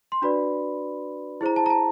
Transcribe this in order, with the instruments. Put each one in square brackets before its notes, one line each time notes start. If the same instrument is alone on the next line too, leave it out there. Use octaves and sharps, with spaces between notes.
[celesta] C6
D4 F#4 B4 D5 B5
E4 G#4 C5 A#5
A5
A#5
A5